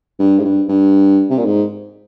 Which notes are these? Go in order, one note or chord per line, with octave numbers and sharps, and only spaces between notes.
G2
G#2
G2
G2
C3
A#2
G#2